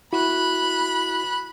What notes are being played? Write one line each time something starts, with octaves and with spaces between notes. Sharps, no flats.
E4 F#4 B5 F#6